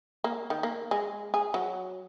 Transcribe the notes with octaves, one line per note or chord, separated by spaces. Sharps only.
A#3
D#3
A#3
G#3
G#4
F#3